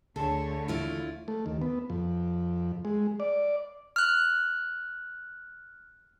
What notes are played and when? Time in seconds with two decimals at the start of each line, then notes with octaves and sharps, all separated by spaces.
0.16 D2 D3 A3 G#4 A4 C#5
0.68 D#2 E3 A#3 E4 F4 D5
1.28 A3
1.46 D#2
1.62 B3
1.90 F2
2.85 G#3
3.20 D5
3.96 F6 F#6